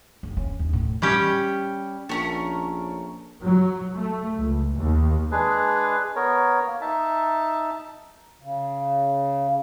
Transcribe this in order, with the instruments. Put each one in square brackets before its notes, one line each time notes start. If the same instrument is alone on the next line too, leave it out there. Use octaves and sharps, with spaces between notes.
[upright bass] F#1
C#4
D#2
A2
[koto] G3 C#4 G4
[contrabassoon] A#1 [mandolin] A3 C#4 A#4
[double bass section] F#3
A3
C#2
D#2
[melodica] G#3 D4 G#4 B4
B3 A#4 C#5
A#3
D#4 E5 A5
[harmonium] C#3